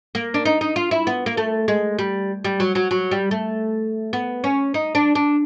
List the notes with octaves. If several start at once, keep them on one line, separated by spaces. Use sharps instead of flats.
A#3
D4
D#4
D#4
F4
E4
B3
A#3
A3
G#3
G3
G3
F#3
F#3
F#3
G3
A3
B3
C#4
D#4
D4
D4